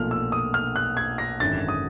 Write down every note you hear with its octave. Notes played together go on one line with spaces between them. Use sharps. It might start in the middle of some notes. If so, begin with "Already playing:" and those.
Already playing: B1 A#2 F3 A3 F6
E6
D#6
F6
F#6
G#6
A#6
G#1 F#2 D3 A6
D#6